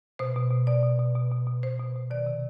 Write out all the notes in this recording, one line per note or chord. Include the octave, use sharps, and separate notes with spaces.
B2 C5
B2
B2
B2 D5
B2
B2
B2
B2
B2
B2 C5
B2
B2
D#3 D5
C3